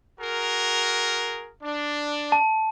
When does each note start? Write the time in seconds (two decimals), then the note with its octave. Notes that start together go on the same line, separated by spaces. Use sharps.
0.19 F#4 G#4 A#4
1.61 D4
2.32 A5